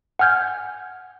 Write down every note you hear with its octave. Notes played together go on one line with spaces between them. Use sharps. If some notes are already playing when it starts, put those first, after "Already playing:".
F#5 G#5 F6 G6 G#6